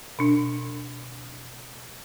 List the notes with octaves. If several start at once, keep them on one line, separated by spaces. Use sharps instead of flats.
B2 D4